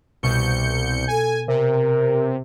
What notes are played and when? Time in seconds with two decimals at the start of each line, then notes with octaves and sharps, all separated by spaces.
0.23 C2 B2 C#6 G6 C#7
1.08 A4 G#5
1.48 C3 A#4